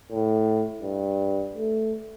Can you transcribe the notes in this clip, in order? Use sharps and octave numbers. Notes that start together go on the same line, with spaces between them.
A2
G2
A3